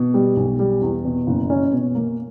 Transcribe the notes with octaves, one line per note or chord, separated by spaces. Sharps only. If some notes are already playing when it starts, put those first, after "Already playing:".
Already playing: B2
G3
B1
G3
E2
B2
F#1
C#4
B2
A#3